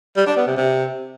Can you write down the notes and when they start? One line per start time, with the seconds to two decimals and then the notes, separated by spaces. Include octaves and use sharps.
0.17 G3
0.27 D4
0.37 B3
0.47 C3
0.57 C3